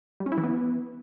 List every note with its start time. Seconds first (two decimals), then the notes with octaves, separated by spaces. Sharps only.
0.20 G3
0.26 C#4
0.32 E4
0.38 E3
0.43 B3